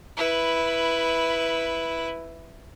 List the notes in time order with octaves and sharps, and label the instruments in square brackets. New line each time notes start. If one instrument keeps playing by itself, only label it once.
[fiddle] E4 B4